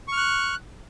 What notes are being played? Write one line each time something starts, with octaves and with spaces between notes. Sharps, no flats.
C#6 F6 F#6